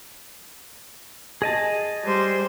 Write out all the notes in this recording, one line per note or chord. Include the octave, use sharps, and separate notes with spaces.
G#4 D#5 A5
G3 C5